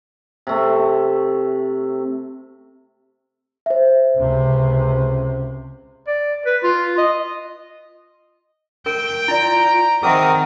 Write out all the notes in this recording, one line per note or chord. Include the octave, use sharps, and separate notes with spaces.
C3 A3
C5 E5
C#2 C3
D5
B4
F4
D#5
A#4 G5
E4 F4 D5 A#5
D#3 C4 G#4 A#4 E5 F#5 D#6